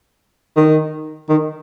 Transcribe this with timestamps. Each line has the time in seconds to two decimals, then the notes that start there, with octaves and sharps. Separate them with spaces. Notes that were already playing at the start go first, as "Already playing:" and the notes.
0.57 D#3
1.29 D#3